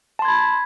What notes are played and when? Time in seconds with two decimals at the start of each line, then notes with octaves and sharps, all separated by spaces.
0.19 A5
0.22 C6
0.25 G#6
0.28 B5